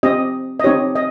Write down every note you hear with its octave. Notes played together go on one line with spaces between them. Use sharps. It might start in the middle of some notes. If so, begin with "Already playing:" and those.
C4 G4 D#5
D#5
C4 D#4 G4 C#5
D#5